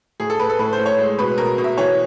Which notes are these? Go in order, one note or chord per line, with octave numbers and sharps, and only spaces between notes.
A2 G#4
A4
A2 B4
A4
A2 B4
C5
A2
C#5
G#3
B2 B4
B2 A#4
B2
E5
E3 C#5